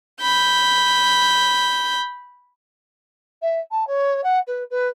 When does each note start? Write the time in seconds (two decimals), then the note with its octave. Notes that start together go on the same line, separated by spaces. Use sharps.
0.22 B5 G6
3.42 E5
3.71 A5
3.87 C#5
4.23 F#5
4.47 B4
4.70 B4